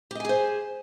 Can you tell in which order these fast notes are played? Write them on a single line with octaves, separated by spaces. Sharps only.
G4 D#5 G#5 G#4 C5